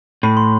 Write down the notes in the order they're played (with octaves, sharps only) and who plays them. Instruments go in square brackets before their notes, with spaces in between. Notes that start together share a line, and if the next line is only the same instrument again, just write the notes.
[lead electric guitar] A2 [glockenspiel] B5
[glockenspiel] C6